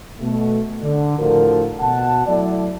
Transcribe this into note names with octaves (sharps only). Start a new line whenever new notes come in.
B2 A3
D3
A2 D3 F3 F#4 A#4
B2 F#5 A5
F#3 A3 E4 D5